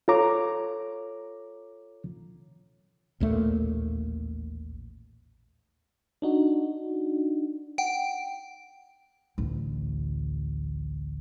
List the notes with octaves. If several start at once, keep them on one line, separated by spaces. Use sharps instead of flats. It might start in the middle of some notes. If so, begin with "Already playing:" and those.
F4 A4 C#5 A#5 D6
A1 D#2 A#2 A3
D4 D#4 F#4
F#5 G5 D7
A1 D2